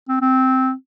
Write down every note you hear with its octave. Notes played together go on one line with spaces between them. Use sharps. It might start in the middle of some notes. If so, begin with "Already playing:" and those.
C4
C4